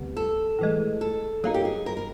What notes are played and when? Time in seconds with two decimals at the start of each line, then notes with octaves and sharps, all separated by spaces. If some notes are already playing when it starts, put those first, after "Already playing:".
Already playing: D2 C3 G3 B3
0.17 A4
0.59 A2 E3 G#3
1.01 A4
1.44 F#3 A#3 D#4 G#4
1.54 G4
1.65 G#4
1.86 A#4
1.97 A#4